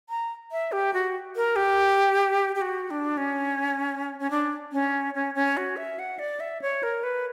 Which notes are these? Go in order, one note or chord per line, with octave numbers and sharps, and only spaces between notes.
A#5
E5
G4
F#4
A#4
G4
G4
F#4
D4
C#4
C#4
D4
C#4
C#4
C#4
F#4
E5
F#5
D5
E5
C#5
A#4
B4